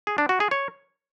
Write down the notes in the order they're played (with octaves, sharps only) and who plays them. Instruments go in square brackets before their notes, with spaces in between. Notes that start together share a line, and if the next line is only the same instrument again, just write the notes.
[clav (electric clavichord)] G#4
D4
F#4
G#4
C#5